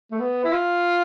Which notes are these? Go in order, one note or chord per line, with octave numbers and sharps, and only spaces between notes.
A3
B3
E4
F4